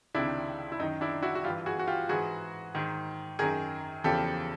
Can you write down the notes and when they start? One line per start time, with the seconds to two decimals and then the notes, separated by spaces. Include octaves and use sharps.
0.15 C#2 C3 D#3 D4 E4
0.72 E4
0.79 F#2 D#4
0.83 D#3
1.01 D4 E4
1.22 E4 F#4
1.35 F#4
1.44 G2 E3 F4 G4
1.66 F#4 G#4
1.79 F#4
1.87 F4 G4
2.09 G#2 E3 F#4 G#4
2.75 G#2 D#3
3.39 F#2 D#3 G#4 A#4
4.04 E2 C#3 F3 G4 A4